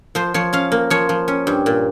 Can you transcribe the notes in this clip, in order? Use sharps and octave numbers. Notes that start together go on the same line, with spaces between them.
F3 C5
F3 C#5
C#4 F5
A#3
F3 C#5
F3
C#4
G2
A#2